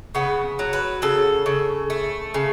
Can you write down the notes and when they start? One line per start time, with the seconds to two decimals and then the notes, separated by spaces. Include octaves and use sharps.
0.15 C#3 B3
0.59 F#3
0.73 B4
1.02 C#3 A4
1.46 C#3
1.90 A3
2.34 C#3